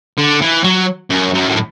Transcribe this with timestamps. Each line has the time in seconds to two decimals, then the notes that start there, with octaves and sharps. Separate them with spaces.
0.18 D3
0.42 E3
0.64 F#3
1.10 F#2
1.34 F#2
1.48 A2